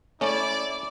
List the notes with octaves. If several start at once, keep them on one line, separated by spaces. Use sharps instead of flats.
A3 C#4 E4 D5